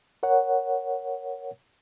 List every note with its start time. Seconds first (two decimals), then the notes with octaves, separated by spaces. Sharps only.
0.23 A#4 C#5 F#5